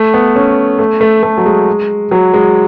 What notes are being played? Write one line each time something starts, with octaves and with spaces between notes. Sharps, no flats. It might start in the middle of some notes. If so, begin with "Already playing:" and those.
Already playing: A3
B3
C#4
A3
A3
A3
F#3
G#3
F#3
G#3